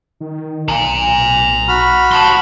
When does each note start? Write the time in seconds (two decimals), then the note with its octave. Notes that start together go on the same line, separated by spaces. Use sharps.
0.21 D#3
0.68 B1 A#5 C6
1.68 F#4 B5 F6
2.12 A5 C6